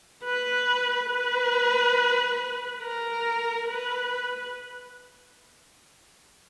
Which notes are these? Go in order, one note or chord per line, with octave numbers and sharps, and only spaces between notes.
B4
B4
A#4
B4